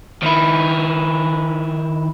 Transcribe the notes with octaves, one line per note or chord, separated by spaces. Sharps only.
D#3 E4